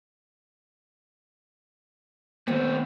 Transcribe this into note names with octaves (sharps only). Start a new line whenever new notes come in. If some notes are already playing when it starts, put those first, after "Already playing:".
D#2 A3 B3 C4